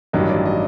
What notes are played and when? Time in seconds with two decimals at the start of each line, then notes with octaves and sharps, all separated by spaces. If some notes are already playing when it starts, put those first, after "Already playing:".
0.13 A1 G2 D#3 F#3 D#5
0.29 D5
0.46 D#5